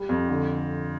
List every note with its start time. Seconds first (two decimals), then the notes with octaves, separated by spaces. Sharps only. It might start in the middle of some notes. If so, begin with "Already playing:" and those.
Already playing: G3
0.09 F2
0.29 D3